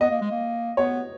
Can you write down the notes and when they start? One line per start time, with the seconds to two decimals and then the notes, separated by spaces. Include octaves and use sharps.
0.01 B3 D#5
0.11 A#3
0.21 G#3
0.31 A#3
0.77 B3 C#5